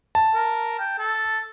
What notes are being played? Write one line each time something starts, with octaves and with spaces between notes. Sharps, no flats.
A5
A#4
G5
A4